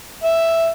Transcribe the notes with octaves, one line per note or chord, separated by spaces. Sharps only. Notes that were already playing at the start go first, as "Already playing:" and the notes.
E5